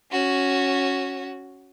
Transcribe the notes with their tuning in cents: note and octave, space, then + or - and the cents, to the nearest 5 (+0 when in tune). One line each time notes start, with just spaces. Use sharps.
C#4 -5 F#4 +0